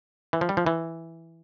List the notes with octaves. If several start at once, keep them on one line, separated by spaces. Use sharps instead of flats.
E3
F3
G3
F3
E3